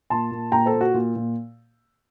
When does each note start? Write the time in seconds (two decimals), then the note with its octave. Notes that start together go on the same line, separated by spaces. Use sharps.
0.10 A#2 A5 C6
0.31 A#2
0.52 A#2 G5 A#5
0.66 A4 C5
0.74 A#2
0.81 F#4
0.94 A#2
1.16 A#2